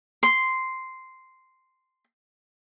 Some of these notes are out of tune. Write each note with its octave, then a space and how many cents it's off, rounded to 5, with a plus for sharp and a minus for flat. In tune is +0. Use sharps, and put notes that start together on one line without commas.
C6 -5